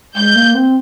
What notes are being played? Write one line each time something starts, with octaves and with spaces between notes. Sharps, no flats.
G#3 G6
A#3
C4